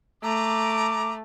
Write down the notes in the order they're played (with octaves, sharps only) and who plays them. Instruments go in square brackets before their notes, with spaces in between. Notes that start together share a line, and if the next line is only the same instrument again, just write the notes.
[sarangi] A3 [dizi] A#5 [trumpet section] D6